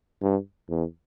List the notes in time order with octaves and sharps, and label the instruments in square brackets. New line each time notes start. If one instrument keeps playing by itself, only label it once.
[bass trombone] G2
E2